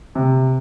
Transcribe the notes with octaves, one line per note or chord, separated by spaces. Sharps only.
C3